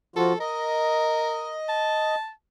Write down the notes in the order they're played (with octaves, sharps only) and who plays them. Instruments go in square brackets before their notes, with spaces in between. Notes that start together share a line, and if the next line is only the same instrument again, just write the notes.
[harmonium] F3 F4 F#4 [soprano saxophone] A4
[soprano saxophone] A#4 [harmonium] D#5
[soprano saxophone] A5